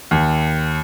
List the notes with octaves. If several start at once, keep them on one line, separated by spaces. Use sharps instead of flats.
D#2